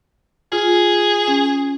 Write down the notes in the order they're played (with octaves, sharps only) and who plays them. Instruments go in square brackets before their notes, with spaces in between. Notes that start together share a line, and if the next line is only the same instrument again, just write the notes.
[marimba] F4 [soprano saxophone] G#4
[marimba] C#4